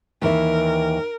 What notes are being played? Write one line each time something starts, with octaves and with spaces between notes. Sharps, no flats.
D#2 E3 A#4 E5